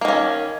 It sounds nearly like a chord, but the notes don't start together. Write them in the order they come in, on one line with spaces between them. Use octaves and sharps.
A#3 D#3 C#4